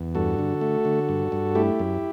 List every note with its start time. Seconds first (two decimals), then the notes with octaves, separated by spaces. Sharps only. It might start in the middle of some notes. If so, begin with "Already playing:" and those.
Already playing: E2
0.15 G2 F#4 A4
0.38 D3
0.61 A3
0.85 D3
1.09 G2
1.32 G2
1.55 A3 E4 G4
1.79 F#2